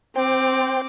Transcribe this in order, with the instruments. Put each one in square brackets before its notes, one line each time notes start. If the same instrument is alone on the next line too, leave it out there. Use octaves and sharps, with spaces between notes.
[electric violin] C4 D6 [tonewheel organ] C5 G5